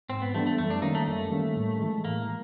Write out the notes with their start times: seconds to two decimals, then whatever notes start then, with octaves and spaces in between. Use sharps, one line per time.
0.09 G#2 C4
0.22 B3
0.34 E3 G3 A3 B3 D4
0.46 A3
0.58 F#2 A3
0.70 D4
0.82 D#3 G3 A#3 C#4 D#4
0.95 A3
1.07 F#2 A3
1.31 D#3 G3 A#3 C#4
1.56 A2
1.79 E3 G#3
2.05 A2 A#3
2.28 E3